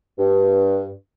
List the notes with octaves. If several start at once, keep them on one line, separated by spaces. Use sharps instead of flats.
G2